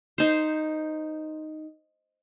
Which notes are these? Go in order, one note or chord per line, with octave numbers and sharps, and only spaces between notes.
D#4 C5